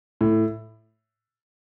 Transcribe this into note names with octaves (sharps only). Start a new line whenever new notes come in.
A2